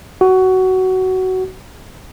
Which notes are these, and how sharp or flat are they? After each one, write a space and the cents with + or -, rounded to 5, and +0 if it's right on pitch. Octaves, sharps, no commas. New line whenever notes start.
F#4 +15